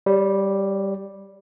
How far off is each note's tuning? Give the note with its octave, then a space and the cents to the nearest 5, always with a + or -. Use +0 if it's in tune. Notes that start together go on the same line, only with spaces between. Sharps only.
G3 +0 C#5 +30